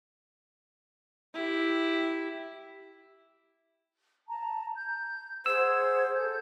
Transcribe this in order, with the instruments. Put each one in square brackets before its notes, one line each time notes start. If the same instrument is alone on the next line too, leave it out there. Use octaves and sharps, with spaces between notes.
[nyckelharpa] E4 G4
[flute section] A5 A#5
G6
[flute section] G#4 F#5 G#6 [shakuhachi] C5 [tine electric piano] E6
[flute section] A4 G6